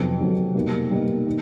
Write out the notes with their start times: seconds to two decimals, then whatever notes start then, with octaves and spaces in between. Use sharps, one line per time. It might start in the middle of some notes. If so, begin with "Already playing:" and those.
Already playing: F2 C3 D#3 F#3 B3
0.19 F2 C3 D#3 F#3 B3
0.55 B2 G3 A#3 D#4
0.91 B2 G3 A#3 D#4
1.26 D#3